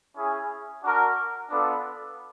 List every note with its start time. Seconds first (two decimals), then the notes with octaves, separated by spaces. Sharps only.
0.15 C#4 E4 G#4
0.83 D4 F#4 A#4
1.50 B3 D4 F4 A4 D5